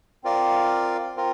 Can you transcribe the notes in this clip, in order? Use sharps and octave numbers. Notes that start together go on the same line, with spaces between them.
C4 F4 A#4 D5 F5
C4 F4 A#4